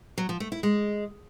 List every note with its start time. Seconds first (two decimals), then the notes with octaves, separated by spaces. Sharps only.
0.18 F#3
0.29 F3
0.40 A3
0.52 E4
0.63 G#3